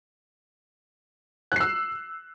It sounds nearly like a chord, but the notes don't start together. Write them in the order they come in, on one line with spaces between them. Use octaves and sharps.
F#6 C7 E6